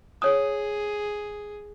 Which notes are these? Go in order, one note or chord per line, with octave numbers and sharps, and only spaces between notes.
G#4 C#5 D#6